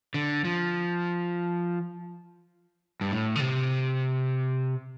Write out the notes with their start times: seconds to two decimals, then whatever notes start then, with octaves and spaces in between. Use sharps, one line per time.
0.14 D3
0.45 F3
3.01 G2
3.11 A2
3.36 D3
3.40 C3